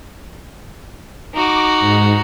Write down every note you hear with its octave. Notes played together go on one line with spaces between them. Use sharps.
D#4 F#4 D6
G#2